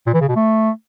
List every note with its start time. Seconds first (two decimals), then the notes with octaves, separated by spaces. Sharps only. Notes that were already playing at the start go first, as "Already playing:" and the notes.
0.07 A#2
0.14 E3
0.21 C#3
0.28 B2
0.36 A3